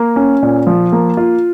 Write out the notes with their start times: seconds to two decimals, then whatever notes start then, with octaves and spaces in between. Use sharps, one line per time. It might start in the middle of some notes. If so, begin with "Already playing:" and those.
Already playing: A#3
0.16 C#4
0.42 A#2
0.67 F3
0.92 A#3
1.17 F4